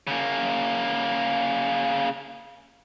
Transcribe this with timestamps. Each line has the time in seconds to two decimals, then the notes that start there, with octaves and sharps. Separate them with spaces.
0.07 C#3 A#3